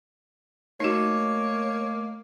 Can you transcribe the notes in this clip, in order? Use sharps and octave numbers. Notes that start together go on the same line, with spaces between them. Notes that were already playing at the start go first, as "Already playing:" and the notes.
A3 A#3 D#4 F#4 C#5 D#5 D6